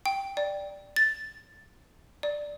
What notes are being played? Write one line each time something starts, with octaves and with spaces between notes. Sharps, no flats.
G5
D5
A6
D5